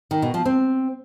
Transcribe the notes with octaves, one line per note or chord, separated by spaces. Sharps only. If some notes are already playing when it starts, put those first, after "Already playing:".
D#3
B2
F3
C4